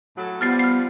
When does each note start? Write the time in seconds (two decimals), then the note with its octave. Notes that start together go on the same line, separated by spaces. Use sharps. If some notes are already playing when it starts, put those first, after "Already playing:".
0.17 A2 F#3 A4
0.41 F3 G3 B3 F6 A6 C7
0.59 F6 C7